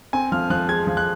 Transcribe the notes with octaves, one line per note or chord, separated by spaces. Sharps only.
C4 G#5
F3 F6
F3 F#6
G#3 G#6
F3
F#6